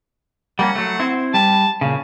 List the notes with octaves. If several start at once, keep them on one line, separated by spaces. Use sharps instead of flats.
G3 A#3 C#4 F#5
F#3 A3
C4 E4 C5
G3 A5
A#2 C#3 C#5